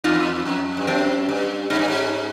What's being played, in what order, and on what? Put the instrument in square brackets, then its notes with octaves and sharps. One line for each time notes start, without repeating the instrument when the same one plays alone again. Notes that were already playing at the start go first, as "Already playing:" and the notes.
[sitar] E2 [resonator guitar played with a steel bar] D#4 F4
[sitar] F2
G2
[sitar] F#2 [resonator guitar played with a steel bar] C4 D4
[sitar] G2
[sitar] G#2 [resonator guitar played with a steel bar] C#4 D#4
[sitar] G2
G#2